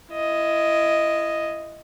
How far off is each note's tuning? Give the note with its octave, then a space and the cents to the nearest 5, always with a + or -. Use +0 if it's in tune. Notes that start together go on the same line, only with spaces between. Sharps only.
E4 +30 D#5 +0